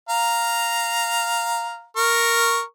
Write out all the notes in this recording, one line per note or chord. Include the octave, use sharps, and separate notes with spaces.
F5 A#5
A#4 C#6